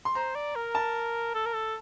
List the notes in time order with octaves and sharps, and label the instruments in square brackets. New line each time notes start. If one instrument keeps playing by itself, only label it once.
[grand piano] C6
[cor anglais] C5 [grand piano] A#5
[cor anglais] D5
A#4
[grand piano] A5
[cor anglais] A4
A#4
A4